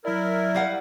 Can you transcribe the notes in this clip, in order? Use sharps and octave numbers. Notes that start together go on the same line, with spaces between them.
F#3 E4 A#4 D5
G3 F5 F#5